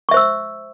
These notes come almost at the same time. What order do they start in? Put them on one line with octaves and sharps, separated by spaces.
C#6 E5 C5 E6